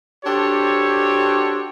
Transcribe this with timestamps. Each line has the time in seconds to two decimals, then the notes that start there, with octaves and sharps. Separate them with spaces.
0.25 D4 F#4 G4 A4 C5 C#5